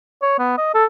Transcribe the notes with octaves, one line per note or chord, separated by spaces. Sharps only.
C#5
B3
D#5
A4